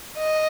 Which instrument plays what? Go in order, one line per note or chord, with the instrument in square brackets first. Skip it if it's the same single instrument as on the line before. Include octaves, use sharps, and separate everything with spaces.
[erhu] D#5